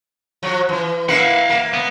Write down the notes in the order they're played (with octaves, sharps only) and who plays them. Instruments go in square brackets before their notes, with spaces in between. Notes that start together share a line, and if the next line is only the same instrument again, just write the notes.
[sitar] F3 F#3
E3
[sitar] A#3 E4 B4 [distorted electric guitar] F5 F#5
[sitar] A#3
[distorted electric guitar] B3